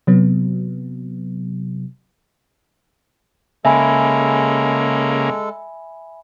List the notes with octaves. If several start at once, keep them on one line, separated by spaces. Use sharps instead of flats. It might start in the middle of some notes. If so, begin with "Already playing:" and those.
C3 F#3 B3
C#3 G#3 A#3 A4 E5 G#5 B5